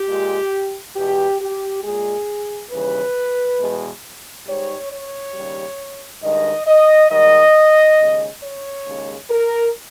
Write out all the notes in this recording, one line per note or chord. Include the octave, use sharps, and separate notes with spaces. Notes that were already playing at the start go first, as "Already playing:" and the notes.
Already playing: G4
A#2 G#3
E2 B2 G#3 G4
G4
A#2 G#3 G#4
D#2 C#3 E3 G3 B4
E2 B2 G#3
G#2 G3 C#5
C#5
D#2 C#3 G3
G2 D#3 G#3 D#5
D#5
G#2 D#3 G3 D#5
D#2 C#3 G#3
C#5
D#2 C#3 G#3
A#4